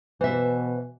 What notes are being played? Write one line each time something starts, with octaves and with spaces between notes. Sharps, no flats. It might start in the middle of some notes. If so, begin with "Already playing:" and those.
B2 E3 C5 E5